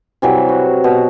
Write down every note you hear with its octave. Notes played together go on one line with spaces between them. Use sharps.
C3 E3 F#3 G3
F#4
B2